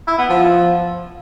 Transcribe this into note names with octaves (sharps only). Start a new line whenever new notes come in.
E4
B3
F3